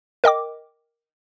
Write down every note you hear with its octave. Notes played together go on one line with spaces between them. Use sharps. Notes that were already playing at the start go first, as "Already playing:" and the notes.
A#4 D#5 G5 D6